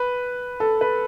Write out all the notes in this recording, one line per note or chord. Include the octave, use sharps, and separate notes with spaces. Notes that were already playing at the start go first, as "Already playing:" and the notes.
Already playing: B4
A4
B4